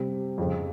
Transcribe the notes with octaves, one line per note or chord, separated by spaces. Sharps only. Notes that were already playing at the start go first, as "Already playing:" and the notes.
Already playing: C3 G3 C4
F2 C#3 F3